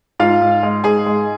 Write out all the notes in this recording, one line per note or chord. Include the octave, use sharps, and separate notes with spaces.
G#2 F4 F5
G#2
G#3
G#2 G#4 G#5
G#3